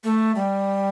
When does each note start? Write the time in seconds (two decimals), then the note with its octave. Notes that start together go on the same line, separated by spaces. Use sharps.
0.04 A3
0.35 G3